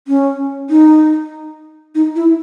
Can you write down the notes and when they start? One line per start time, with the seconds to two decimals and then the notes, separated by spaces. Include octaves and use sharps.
0.08 C#4
0.70 D#4
1.95 D#4
2.16 E4